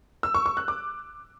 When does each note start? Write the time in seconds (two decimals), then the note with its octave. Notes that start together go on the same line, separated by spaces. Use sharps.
0.23 E6
0.34 C#6
0.46 C#6
0.57 F#6
0.68 D6